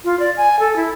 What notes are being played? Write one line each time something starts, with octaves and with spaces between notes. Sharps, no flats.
F4
D5
G#5
A4
E4